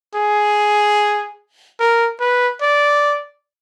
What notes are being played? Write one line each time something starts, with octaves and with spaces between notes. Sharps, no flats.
G#4
A#4
B4
D5